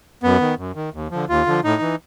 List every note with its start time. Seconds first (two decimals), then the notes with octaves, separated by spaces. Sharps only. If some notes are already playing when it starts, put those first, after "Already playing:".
0.23 F#2 B3
0.41 D#3
0.58 F#2
0.76 D#3
0.94 D#2
1.11 D3 F3
1.29 D#2 F4
1.46 D3 F3
1.64 A2 D#4
1.81 E3